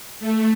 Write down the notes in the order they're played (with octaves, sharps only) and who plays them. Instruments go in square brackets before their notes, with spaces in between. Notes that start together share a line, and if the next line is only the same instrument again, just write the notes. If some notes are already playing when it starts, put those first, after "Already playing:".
[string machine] A3